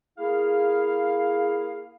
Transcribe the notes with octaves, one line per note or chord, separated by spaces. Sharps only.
A#3 E4 G#4 F5